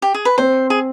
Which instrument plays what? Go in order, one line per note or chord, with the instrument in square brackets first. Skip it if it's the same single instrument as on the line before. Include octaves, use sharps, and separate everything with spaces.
[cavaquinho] G4
G#4
B4
[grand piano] C4 [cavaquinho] C5
[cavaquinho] G#4